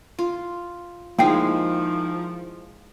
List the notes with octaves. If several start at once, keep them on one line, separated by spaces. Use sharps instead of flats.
F4
D#3 F3 G#3 A#3 D#4 E4 G5 C7